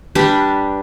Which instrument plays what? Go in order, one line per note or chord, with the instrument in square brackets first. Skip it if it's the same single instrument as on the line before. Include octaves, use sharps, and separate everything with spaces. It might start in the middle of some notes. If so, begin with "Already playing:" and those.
[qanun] G3 D4 B4